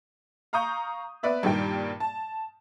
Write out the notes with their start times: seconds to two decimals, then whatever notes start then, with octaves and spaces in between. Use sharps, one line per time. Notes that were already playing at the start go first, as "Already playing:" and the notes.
0.53 F5 A#5 C#6 D#6 G6
1.23 B3 B4 D5 E5
1.43 G2 A#2 D#3 G3 G5
2.00 A5